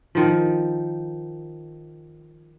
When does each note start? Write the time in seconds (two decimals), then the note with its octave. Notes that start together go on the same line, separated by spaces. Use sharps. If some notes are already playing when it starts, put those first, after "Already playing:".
0.15 D#3 F3